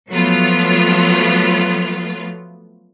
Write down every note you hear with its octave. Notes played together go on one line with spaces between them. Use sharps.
F3 F#3 A3 B3 F4